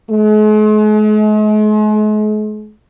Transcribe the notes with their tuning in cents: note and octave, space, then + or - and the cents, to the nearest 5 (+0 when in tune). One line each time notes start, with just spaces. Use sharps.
G#3 +45